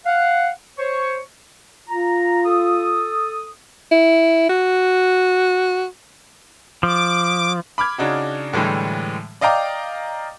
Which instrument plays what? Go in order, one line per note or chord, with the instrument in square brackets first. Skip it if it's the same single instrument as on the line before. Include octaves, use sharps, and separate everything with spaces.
[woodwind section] F5 F#5
C5 C#5 C#6
[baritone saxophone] F4 [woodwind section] A#5
[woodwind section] A4 D#6
[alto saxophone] E4
F#4
[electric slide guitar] F3 [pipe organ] D6
[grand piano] B5 D6 F6 G#6
C#3 D4 D#4 F#4
A2 D3 E3 G3 G#3
D5 D#5 F5 G5 A#5 D6